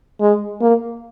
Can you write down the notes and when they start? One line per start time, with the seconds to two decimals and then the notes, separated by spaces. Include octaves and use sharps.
0.21 G#3
0.61 A#3